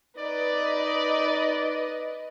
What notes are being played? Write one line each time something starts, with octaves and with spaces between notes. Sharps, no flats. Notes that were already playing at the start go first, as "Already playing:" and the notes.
D#4 B4 D5 D#5